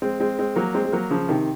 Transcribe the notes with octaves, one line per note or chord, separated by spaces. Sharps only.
G#3 C4
G#3 C4
G#3 C4
F#3 A#3
G#3 C4
G#3
F#3 A#3
C#3 F3
C3 D#3